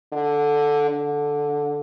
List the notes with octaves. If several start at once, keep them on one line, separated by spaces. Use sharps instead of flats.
D3
D3